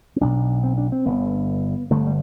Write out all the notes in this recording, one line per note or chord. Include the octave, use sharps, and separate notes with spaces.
C4
B1 B2 D4
C4
D4
C4
G1 G2 D3 B3
G1 G2 D3 A3
G3